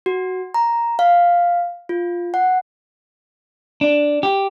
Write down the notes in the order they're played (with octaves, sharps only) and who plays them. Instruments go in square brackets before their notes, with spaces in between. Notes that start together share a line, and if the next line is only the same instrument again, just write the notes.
[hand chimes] F#4
A#5
F5
F4
F#5
[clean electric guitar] D4
G4